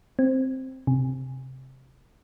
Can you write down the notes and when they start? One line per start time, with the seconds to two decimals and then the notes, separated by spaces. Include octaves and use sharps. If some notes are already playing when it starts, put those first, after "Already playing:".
0.19 C4
0.87 C3